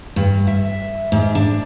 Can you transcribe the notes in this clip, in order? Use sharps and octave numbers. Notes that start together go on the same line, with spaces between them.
G2
E5
G#2
D4